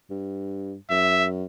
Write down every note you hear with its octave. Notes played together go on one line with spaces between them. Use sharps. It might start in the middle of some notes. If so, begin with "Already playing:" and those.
G2
F#2 E5